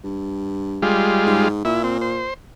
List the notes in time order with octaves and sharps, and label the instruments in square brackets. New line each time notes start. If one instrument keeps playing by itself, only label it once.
[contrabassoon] G2
[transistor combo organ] G3 G#3 F4
[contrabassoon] G#2
[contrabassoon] A#2 [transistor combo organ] E4
[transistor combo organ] C4
C5